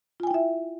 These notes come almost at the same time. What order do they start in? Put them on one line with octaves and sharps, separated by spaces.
F4 G#5 G5 E4 E5